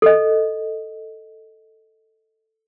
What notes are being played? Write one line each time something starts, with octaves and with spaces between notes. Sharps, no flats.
A4 D#5